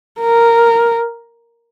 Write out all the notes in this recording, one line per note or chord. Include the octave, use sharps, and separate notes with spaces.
A#4